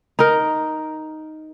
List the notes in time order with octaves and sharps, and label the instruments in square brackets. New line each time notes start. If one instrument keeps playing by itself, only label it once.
[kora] D#4 A#4